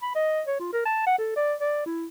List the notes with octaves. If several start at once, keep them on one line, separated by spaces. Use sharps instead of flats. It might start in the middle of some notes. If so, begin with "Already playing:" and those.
B5
D#5
C#5
F4
A#4
A5
F#5
A4
D5
D5
E4